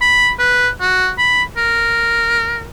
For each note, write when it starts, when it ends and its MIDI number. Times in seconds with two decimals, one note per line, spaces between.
0.01 0.31 83
0.39 0.68 71
0.81 1.10 66
1.18 1.43 83
1.57 2.66 70